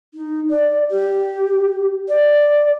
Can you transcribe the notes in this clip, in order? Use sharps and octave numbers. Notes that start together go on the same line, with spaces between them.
D#4
D5
G4
D5